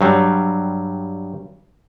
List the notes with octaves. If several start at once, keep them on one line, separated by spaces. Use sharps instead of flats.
G2 F#3 G3